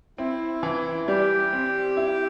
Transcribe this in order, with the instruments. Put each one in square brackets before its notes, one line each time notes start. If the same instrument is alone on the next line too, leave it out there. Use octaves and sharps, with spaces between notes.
[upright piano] C4 [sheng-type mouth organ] E4
[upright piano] E3
[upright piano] G3 [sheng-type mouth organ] G4
[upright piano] C4
E4